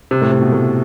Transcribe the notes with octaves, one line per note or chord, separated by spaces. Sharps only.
C3
A2
C3
B2
A2